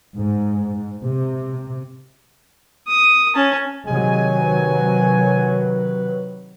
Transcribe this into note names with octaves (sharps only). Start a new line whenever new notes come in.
G#2
C3
D#6
C#4 A5
C3 D#3 F#3 G#3 G#5
B4